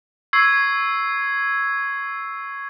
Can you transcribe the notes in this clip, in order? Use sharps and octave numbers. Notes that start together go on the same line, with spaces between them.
C#6 E6 G#6 C7